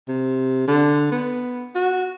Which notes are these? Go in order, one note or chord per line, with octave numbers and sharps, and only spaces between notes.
C3
D3
B3
F#4